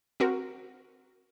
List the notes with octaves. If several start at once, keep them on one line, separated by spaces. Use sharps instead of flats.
C4 F#4 A#4